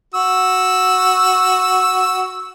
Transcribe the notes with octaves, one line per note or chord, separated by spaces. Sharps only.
F#4 E6